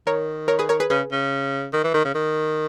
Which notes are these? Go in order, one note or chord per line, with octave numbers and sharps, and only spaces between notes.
D#3 A#4 C#5
A#4 C#5
G#4 B4
A#4 C#5
G#4 B4
C#3 G#4 B4
C#3
D#3
E3
D#3
C#3
D#3